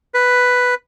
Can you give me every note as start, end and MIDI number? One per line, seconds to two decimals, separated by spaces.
0.14 0.75 71